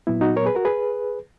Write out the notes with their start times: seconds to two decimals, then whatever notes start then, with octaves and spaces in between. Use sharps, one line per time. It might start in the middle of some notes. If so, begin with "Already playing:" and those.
0.07 A#2 F#3 B3 E4
0.21 D#4 F#4
0.36 A#4 C#5
0.46 G#4 B4
0.55 F#4 A#4
0.65 G#4 B4